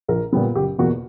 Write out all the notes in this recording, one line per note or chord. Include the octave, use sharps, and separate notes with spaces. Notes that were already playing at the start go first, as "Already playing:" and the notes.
A#1 A#4
A#2 G3 B3
F#1 G4
E2 B2 A#3 F#4